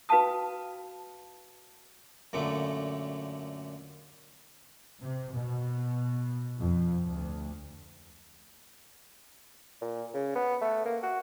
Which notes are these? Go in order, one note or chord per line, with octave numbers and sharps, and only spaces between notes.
F#4 B4 F5 G5 A5 D#6
F#2 A#2 D3 A3
C3
B2
F2
D2
A#2
C#3
B3
A3
A#3
F#4